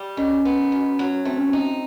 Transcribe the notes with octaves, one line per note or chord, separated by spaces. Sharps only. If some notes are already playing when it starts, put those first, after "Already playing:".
Already playing: G3
D#3 C#4
B3
F#2
F#3
A3 C4
C#4
C4 D#4